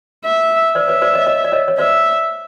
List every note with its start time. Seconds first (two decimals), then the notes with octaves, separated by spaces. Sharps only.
0.25 E5
0.75 C5 D5 E5
0.88 B4 C#5
1.02 C5 D5
1.14 C#5 D#5
1.26 C#5 D#5
1.44 D5
1.52 C#5 D#5
1.68 C#5
1.78 C5 D5 E5